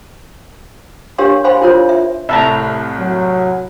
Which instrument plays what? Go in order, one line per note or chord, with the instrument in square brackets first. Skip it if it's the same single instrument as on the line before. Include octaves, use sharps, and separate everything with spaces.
[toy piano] D4 G4 A#4 C#5 F5 C6
C5 F5 G#5 B5 C6
E4 F4 A#4 C5 C#5
E5
[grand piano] C2 A2 [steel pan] E5 A5 A#5
[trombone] F#3